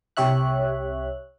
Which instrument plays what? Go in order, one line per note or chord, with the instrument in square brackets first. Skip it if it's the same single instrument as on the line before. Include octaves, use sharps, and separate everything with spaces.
[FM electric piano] C2 C3 G4 C#5 E5 F#6